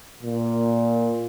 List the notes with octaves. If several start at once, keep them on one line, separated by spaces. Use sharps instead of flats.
A#2